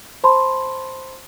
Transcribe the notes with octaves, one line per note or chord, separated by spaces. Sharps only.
C5 A5 B5 C6